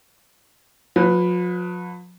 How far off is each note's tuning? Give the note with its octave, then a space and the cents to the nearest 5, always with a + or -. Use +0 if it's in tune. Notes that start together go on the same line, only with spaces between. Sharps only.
F3 +45 B4 +0